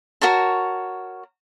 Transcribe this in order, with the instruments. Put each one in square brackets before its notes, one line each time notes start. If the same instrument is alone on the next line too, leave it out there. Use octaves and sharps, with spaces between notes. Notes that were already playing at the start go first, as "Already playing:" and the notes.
[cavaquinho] F#4 A#4 C#5 A5